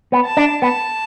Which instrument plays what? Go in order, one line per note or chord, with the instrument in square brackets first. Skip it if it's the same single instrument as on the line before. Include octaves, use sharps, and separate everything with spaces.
[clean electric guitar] B3
[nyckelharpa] A5
[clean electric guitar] D4
[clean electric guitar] B3 [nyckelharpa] A5